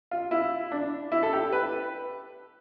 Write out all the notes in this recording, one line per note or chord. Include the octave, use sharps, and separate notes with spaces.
F4
E4
D4
E4
A4
G4
B4